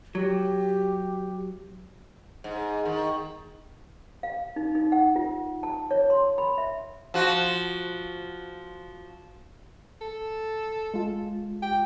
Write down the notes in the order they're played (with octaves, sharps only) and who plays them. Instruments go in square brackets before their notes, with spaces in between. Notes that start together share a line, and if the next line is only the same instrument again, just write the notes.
[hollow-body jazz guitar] F#3 [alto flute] G4
[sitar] G#2
D#3
[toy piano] F5
D#4
D#4
F#5
F4
A5
C#5
C6
B5
E5
[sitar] F3 F#4
[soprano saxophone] A4
[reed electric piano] G#3 F4
[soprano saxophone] G5